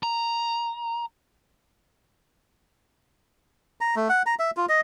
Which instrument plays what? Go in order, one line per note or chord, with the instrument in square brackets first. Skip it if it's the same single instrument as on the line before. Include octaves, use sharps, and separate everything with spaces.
[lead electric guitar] A#5
[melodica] A#5
A3
F#5
A#5
E5
F4
D#5